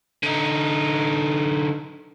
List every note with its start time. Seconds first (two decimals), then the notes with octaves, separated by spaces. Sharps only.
0.23 D3 D#4